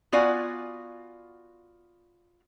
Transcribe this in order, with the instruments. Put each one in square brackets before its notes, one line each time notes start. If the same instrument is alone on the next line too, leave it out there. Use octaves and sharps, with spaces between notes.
[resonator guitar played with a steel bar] B3 F4 F#4 D5 F5 G#5